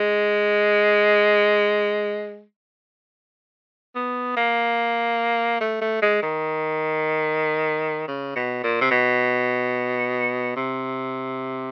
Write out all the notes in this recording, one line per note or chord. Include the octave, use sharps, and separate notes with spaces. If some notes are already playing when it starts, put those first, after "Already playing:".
Already playing: G#3
B3
A#3
A3
A3
G#3
D#3
C#3
B2
A#2
C3
B2
C3